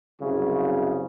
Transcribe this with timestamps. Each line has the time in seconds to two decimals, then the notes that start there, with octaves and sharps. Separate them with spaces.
0.21 C2 F#2 C#3